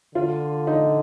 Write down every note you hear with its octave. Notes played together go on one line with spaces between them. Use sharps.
D3 F4
D#4